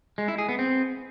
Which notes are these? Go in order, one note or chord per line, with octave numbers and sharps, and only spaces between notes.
G#3
E4
G#4
B3
C4